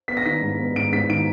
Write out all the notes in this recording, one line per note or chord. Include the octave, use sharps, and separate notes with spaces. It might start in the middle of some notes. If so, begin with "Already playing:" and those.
B3 B6
A#6
D#3 B6
G#2
B3
G#2 D7
G#2 B6
D#3 D7